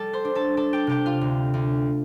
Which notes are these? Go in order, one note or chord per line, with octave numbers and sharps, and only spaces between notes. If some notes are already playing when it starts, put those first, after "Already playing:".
Already playing: G3 A4 A5
C5 C6
D4
A4 A5
D4 A4 A5
G4 G5
C3 G4 G5
F4 F5
D2
D2